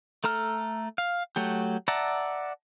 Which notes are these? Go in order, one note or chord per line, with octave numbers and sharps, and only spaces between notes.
A3 A4 A#5 F6
F5
F#3 A3 G4
D5 E5 F#5 A5 A#5